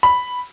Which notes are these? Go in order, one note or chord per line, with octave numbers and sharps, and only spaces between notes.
B5